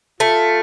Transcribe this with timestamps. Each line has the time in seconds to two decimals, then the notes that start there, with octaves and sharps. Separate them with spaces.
0.20 A3 F4